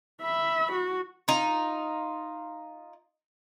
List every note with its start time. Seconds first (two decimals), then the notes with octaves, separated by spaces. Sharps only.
0.22 E5 B5
0.72 F#4
1.28 D#4 F4